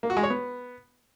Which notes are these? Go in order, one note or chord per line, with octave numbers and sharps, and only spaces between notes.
A#3
F#4
G#3
C#5
B3